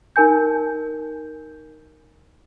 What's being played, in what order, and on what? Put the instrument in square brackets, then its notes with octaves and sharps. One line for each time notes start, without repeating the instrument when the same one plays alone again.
[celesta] D#4 A#4 G#5 G6